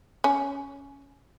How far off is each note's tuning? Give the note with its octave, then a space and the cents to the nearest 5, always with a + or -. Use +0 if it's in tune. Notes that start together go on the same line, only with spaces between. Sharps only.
C#4 +5